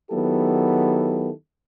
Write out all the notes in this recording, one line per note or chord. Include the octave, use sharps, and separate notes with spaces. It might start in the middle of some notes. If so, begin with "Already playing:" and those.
D#3 F#3 B3 E4 G4 A4